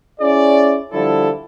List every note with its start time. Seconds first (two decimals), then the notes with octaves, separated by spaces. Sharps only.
0.20 C#4 E4 G#4 D5
0.92 D3 F3 G3 E4 A4